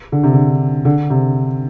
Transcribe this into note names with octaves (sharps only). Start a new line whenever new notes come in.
D3
C3
D3
D3
C3